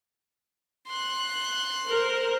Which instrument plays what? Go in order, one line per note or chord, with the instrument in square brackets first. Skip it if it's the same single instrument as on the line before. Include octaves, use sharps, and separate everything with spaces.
[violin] C6 F#6
[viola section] A#4 C5